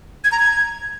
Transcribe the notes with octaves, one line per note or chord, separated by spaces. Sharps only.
G#6
A#5
G#6